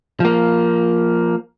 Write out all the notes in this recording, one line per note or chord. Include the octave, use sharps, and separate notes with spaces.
F3 A#3